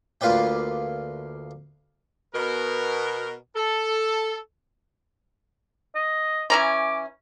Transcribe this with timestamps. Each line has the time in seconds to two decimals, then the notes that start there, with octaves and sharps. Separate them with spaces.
0.21 D2 A#3 F4 B4 D5 G5
2.34 B2 A#4
3.56 A4
5.95 D#5
6.50 E3 C#4 A#5 D6